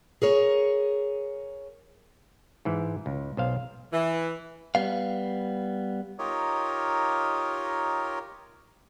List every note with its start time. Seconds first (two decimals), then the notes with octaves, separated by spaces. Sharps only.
0.22 G#4 A#4 C#5
2.65 G#2 E3
3.06 C#2
3.37 B1 C5 F5
3.93 E3
4.75 G3 B3 F5
6.19 D#4 F4 G4 A#4 C#5 D#5